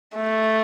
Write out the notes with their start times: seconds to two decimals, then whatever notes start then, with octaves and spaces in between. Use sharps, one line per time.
0.16 A3